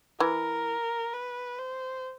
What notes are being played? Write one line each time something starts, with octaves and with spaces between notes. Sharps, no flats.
E3 A#4
B4
C5